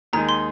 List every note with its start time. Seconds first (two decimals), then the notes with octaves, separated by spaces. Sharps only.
0.13 D#2 D#3 G#3 D#4 G#4 A#5
0.29 C6